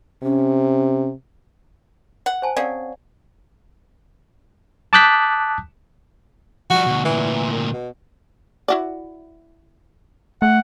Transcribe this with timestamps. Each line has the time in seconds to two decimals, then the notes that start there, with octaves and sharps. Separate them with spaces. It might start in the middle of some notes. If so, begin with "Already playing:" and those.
0.23 C3 C#4
2.26 F#5
2.42 C5 G#5 A5
2.57 C4 C#4 G#4 D5 F5 F#5
4.93 A5 D6 D#6 F#6 G6 B6
6.70 F3 G3 F#4
6.87 D2 B2
7.05 D2 A#2 E3
7.52 D#3
7.73 B2
8.68 E4 F#4 D5
10.42 A3 F#5